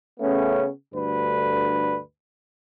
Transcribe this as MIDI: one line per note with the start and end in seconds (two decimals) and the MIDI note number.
0.20 0.67 49
0.20 0.67 57
0.20 0.67 59
0.20 0.67 61
0.93 1.98 38
0.93 1.98 43
0.93 1.98 50
0.93 1.98 71